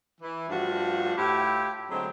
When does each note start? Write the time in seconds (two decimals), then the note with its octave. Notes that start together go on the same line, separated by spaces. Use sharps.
0.21 E3
0.49 G2 F3 A3 D4 F4 F#4
1.17 A2 E4 F4 G4
1.90 D3 F#3 G#3 A3 C4